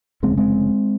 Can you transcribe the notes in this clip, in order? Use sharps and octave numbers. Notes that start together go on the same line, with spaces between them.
F1 D#2 C#3 G#3 C4
G#3 C4